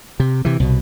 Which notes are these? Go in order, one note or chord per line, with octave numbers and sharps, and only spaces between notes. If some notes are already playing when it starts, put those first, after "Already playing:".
C3
C3 E3
C2 B2